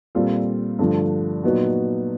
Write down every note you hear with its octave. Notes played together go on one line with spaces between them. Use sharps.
A#2 G3 C4 F4 A4
G2 D3 F3 A3
A#2 F#3 B3 D#4 F#4